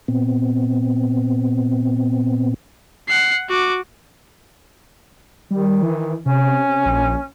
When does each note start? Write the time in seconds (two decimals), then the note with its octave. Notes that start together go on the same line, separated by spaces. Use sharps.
0.08 A#2 B3 C4
3.08 F#5 C7
3.49 F#4 D6
5.51 D#3 G3
5.83 E3
6.26 C3 C#4
6.86 A#1